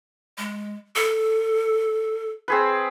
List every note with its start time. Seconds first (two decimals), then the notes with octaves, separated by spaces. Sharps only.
0.38 G#3
0.96 A4
2.48 C4 G#4 B4